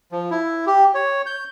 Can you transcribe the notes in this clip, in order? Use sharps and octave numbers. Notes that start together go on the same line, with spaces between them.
F3
E4
G4
C#5
G6